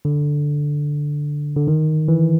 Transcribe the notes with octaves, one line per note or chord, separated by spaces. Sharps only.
D3
D3
D#3
E3